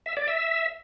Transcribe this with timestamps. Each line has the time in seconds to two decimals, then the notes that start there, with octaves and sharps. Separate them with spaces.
0.06 E5
0.17 D5
0.28 E5